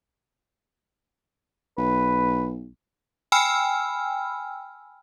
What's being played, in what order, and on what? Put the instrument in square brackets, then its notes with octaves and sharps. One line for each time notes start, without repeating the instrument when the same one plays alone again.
[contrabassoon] B1 [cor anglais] B4
[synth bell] G5 G#5 B5 E6 F6